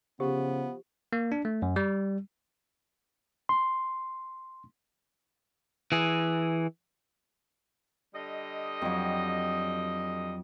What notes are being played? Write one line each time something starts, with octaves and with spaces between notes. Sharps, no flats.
C#3 F3 B3 G4
A#3
D4
A3
F#2
G3
C6
E3 G#4
D3 G3 D#5
F2 F#3